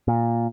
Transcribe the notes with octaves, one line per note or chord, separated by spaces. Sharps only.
A#2